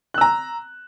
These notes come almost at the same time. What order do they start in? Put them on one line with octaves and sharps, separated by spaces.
F#6 E6 A#5